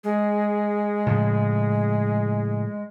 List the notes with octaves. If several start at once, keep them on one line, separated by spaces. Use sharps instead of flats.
G#3
A2 C#3 F3